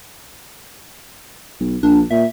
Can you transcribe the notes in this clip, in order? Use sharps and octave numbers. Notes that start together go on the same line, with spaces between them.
B1
A#1 D4
A#2 E5